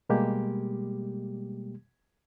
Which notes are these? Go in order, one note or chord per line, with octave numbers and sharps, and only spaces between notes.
B2 G3 G#3 A#3 G4